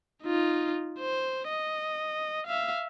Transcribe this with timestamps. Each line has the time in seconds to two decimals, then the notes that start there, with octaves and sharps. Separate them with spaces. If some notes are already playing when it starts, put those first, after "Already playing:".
0.23 D#4 F4
0.99 C5
1.49 D#5
2.47 E5 F5